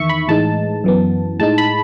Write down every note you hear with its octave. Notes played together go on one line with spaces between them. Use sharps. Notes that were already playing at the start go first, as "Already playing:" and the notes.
Already playing: E2 D#3 E5 C#6
B5
A2 E3 G#3 D#4 A5
F#2 E3 B3
A2 G#3 D#4 A5
B5